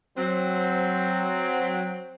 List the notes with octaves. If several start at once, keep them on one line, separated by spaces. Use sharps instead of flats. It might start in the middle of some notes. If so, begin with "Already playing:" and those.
F#3 C4